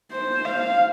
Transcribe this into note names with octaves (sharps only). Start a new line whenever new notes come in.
C5
F5